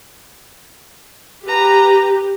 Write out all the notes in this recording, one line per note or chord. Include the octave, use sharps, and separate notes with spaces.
G4 B4 A#5